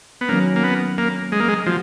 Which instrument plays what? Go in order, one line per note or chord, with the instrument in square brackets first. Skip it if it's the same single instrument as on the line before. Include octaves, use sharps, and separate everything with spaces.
[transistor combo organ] B3
[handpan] D#3 F#3 C#4 [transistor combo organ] A#3
[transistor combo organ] A#3
B3
A#3
G#3
A#3
G#3
[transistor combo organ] F3 [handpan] F#4